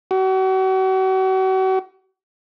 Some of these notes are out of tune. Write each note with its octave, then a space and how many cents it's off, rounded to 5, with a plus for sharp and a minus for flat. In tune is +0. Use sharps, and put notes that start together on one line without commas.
F#4 +40